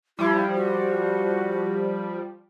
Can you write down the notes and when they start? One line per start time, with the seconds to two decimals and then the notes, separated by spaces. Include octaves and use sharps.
0.19 F3 G3 E4 G4
0.55 F#4